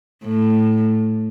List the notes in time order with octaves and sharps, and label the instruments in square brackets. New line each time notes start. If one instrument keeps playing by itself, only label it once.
[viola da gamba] A2